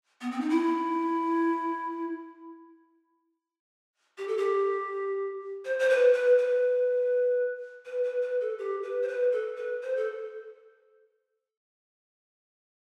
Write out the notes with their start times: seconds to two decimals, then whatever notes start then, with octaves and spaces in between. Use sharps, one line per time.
0.21 B3
0.31 C4
0.40 D#4
0.49 E4
4.18 G4
4.28 A4
4.38 G4
5.65 C5
5.79 C5
5.89 B4
6.13 B4
6.38 B4
7.85 B4
8.04 B4
8.22 B4
8.40 A4
8.58 G4
8.83 B4
9.02 C5
9.08 B4
9.32 A4
9.56 B4
9.82 C5
9.97 A4